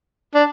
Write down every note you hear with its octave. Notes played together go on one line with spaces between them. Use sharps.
D4